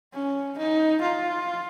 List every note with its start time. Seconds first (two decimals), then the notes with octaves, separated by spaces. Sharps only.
0.14 C#4
0.59 D#4
1.02 F4